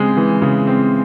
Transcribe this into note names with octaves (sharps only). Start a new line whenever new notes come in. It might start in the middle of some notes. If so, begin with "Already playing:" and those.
Already playing: C#3 G#3 C4
E3
C#3
C4